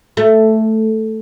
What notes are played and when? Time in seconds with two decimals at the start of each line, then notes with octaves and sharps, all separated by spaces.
0.17 A3